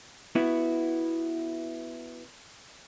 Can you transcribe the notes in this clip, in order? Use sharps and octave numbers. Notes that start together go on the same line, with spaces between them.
B3 E4 F#4